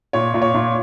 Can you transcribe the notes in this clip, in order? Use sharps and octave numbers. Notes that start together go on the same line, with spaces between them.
A#2 C#5
A#2
C#5
A#2